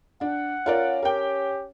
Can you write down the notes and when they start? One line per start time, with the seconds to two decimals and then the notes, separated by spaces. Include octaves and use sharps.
0.21 D4 F#5
0.66 C#4 F4 A#4 D5
1.03 G4 A#4 G5